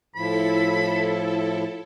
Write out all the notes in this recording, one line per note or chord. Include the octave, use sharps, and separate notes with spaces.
A2 F3 E4 A4 B5